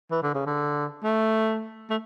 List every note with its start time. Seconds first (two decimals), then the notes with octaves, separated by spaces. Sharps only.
0.11 E3
0.22 D3
0.34 C#3
0.46 D3
1.04 A3
1.90 A3